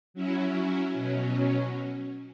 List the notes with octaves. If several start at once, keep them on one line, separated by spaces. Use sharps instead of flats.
F#3 C#4 E4
B2 F#3 C#4